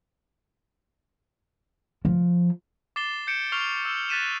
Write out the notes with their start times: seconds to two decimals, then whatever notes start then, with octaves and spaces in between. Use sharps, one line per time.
2.05 F3
2.96 D6 A6 C7 E7 G7
3.27 G6 C#7 D7 E7
3.52 C#6 F6 C7 F7 G7
3.85 E6 E7
4.09 F#6 A6 B6 D#7 E7